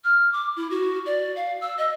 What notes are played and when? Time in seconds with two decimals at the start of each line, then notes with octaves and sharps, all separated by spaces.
0.04 F6
0.33 D6
0.56 E4
0.70 F#4
1.06 D5
1.36 F5
1.61 E6
1.78 D#5